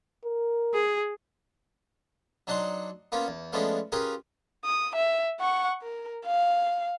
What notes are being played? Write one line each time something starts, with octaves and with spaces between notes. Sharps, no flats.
A#4
G#4
F#3 D4 D#4 F#5 C6
A#3 B3 C#4 F4
E2
F3 G#3 A3 B3 C#4 D4
C#4 F4 G4 G#4 A#4 B4
D#6
E5
F#5 C#6
A#4
F5